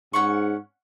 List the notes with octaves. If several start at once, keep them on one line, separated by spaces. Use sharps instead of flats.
G#2 C#4 F#5 C#6